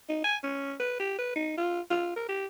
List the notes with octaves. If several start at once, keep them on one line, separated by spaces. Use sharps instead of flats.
D#4
G#5
C#4
B4
G4
B4
D#4
F4
F4
A#4
G4